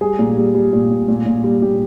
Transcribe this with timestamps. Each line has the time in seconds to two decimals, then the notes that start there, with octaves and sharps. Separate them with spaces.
0.01 G3 G#4
0.19 A#2
0.37 G3
0.55 G3
0.73 A#2
0.91 A#2
1.08 A#2
1.26 A#2
1.44 G3
1.62 A#2 G4